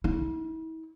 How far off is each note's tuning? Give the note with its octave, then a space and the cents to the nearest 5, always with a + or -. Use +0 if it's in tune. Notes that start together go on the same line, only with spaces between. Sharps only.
E4 -40